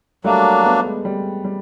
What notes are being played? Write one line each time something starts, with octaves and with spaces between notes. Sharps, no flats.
F#3 G3 A3 A#3 D4
A3 B3
G#3
G3
G3